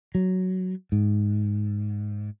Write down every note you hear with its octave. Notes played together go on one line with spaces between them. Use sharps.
F#3
G#2